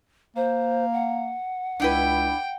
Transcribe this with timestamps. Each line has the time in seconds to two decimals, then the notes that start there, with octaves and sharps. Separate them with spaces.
0.36 A#3 C5
0.93 F#5
1.80 C#2 D4 E4 B4 G5